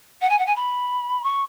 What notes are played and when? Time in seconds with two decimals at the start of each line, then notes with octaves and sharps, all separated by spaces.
0.21 F#5
0.29 G#5
0.38 F#5
0.46 G#5
0.55 B5
1.23 C#6